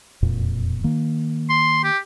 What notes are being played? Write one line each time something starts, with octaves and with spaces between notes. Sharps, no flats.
E1 F2 A#2
D#3 A#3
C6
G4